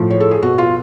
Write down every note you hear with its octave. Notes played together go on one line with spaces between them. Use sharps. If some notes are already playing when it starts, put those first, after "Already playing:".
Already playing: A2 F3
C#5
A4
G#4
B2 F#4
F4